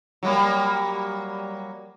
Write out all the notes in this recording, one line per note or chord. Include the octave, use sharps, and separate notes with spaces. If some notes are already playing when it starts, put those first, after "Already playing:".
F#3 G3 A#3